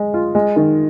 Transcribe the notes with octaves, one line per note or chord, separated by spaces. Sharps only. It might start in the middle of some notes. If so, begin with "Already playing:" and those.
Already playing: G#3 G#4
F4
G#3
D#3